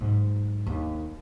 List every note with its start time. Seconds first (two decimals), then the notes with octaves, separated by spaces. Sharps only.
0.01 G#2 F#3
0.67 D#2 D4